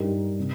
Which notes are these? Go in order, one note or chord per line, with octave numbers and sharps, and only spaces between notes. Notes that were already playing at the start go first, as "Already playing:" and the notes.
Already playing: G2 G3 D#4 A#4
C3